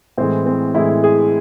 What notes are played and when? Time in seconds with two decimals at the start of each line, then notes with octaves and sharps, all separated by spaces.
0.18 A2 E3 G#3 C4
0.46 C4
0.74 A2 E3 G#3 E4
1.04 G#4